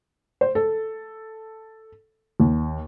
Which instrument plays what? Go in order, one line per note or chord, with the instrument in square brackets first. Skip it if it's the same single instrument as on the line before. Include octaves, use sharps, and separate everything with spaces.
[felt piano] C5
A4
D#2